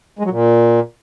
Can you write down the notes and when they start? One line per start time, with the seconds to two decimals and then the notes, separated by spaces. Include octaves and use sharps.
0.19 G#3
0.25 F#3
0.31 A#2